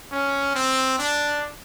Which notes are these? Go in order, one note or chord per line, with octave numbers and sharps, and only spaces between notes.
C#4
C4
D4